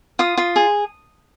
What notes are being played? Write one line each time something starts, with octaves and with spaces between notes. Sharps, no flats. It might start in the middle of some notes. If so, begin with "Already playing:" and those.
F4 D#6
F4
G#4